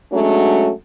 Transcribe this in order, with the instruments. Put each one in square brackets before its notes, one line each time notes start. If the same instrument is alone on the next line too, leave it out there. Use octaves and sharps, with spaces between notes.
[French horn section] F#3 G#3 A3 C#4 D4 F#4